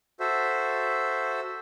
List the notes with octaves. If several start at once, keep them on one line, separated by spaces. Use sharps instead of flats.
F#4 A4 C5 E5